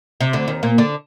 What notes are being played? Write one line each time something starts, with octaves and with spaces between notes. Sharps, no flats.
C3
D2 D3
D#2 D#3
A#2 A#3
D3 D4